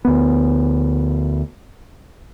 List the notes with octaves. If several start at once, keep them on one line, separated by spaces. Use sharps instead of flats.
D2 B3